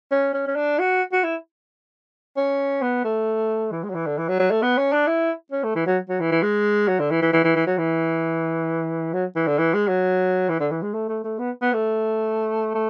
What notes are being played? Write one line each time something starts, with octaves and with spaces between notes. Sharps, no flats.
C#4
C#4
C#4
D4
F#4
F#4
E4
C#4
B3
A3
E3
G#3
F#3
E3
D3
E3
F#3
F#3
A3
B3
C#4
D4
E4
C#4
A3
E3
F#3
F#3
E3
E3
G#3
F#3
D3
E3
E3
E3
E3
E3
F#3
E3
F#3
E3
D3
E3
G#3
F#3
E3
D3
E3
G#3
A3
A3
A3
B3
B3
A3
A3